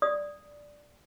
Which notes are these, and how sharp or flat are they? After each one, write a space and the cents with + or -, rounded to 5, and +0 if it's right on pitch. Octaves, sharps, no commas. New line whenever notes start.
D5 +0 D#6 +0